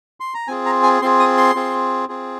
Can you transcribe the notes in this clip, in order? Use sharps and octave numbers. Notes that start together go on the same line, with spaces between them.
C6
A#5
C4 F4 G#4 G#5
A#5
G#5
C4 F4 G#4 C6
D#6
C6
C4 F4 G#4
C4 F4 G#4